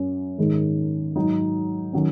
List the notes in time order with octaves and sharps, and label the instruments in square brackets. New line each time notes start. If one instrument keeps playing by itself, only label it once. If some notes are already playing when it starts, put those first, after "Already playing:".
Already playing: [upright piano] F#2 F#3 C#4
G#2 D#3 G#3
G#2 F#3 D#4
D#3 F#3 C#4